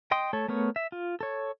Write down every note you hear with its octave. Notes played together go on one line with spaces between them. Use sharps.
D#5 G5 C6 D#6
A3 A4 C#5
A3 B3 A#4 C#5
E5
F4
A4 C#5